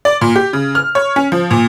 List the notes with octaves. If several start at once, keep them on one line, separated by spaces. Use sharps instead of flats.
D5
A#2
G4
C#3
F6
C#5
C#4
F3
A#2